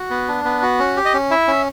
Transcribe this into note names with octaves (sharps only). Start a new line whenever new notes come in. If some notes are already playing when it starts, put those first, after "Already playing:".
Already playing: F#4
B3
D4
B3
F#4
C#4
G4
D#5
C#4
E4 E5
C#4